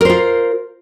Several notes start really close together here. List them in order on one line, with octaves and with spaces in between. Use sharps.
A#4 C5 F4